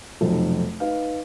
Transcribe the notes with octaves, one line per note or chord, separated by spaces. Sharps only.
F1 B1 F2 A4
D#4 B4 F5